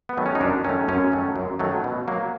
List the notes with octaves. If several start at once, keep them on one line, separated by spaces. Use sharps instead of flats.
B3
D#3 F#3 A3
C#4
D#4
F#2 D4
D#3 F#3 A3 C#4
F#2 C#4
D#3 F#3 A3
F#2
D#3 F#3 A3
B2
F#3 A#3